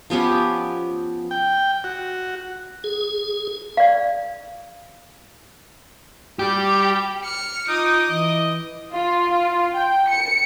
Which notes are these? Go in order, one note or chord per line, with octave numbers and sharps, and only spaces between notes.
F3 B3 C#4 G4
G5
F#4
G#4
D5 F5
G3 G4
F6 C#7
D#4 F4 D6 D#6
E3 D#5
F4
F4
G5
C#7